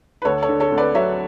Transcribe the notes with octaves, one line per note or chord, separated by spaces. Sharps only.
B4
D2 A4 C#5
A4 C#5
D3
A4 C#5
D2
B4 D5
F#3 C#5 E5